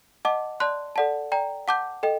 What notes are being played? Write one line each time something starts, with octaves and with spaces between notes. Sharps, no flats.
D#5 F#5 A5 D6
D5 A5 C6 F#6
A4 D5 F#5 A5
D5 G5 A#5
F#5 A5 D6 G6
A4 D#5 G5